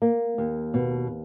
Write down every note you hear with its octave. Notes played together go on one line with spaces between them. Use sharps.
A#3
D#2
B2